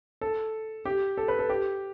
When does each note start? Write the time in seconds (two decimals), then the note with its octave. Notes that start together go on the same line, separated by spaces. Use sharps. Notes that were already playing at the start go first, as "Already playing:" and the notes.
0.21 A4
0.85 G4
1.17 A4
1.28 B4
1.39 A4
1.50 G4